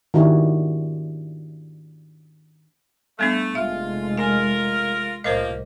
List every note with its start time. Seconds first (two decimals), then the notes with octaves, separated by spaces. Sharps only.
0.14 D#3 D4 E4 F#4 G4
3.19 G3 A3 B3 D4
3.55 F1 G#3 A3 F4 E5
4.17 F4 A#4 G#5
5.24 C2 A2 F3 A#3 A#4 C5 D#5